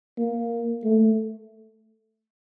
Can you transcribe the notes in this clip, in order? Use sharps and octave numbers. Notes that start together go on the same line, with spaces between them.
A#3
A3